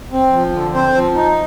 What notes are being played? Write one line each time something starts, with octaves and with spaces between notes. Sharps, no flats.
C4
F3
D3
C4 C5
F3
D#4